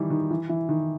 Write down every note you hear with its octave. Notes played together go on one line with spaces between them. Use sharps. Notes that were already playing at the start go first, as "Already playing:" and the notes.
Already playing: D#3 E3 G3
D#3
E3
E3
D#3